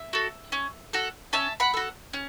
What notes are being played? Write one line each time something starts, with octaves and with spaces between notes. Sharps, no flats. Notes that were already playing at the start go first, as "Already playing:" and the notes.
Already playing: E5
F#4 A4
C#4
F#4 A4
C#4 E5 A5
F#5 B5
F#4 A4
C#4